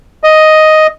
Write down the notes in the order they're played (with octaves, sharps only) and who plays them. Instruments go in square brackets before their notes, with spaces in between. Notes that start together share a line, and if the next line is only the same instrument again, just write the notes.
[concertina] D#5